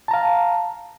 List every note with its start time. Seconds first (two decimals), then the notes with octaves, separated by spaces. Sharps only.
0.08 A5
0.11 A#5
0.14 F5